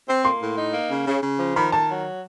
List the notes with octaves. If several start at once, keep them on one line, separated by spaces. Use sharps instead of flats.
C4
A#3 C6
A2
D#4
A#3
C#3
C#3
C#3
F3
D#3 B5
D#3 A5
F#3